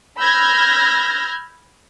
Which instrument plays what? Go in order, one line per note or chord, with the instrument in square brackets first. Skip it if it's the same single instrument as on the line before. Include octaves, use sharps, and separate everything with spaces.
[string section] B5 E6 F6 G6 G#6 A#6